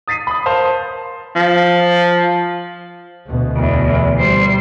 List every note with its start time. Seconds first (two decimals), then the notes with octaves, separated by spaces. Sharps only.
0.08 D#6 A6 B6 C7 D#7
0.27 B5 D#6
0.46 A#4 C5 F5 A5 C6
1.36 F3
3.27 D2 B2
3.57 E2
4.17 G3 C5